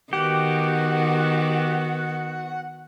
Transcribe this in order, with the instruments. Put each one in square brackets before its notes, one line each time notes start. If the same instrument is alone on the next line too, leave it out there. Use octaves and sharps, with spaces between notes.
[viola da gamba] D#3 [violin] B3 F#4 [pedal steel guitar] G4 [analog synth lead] F#5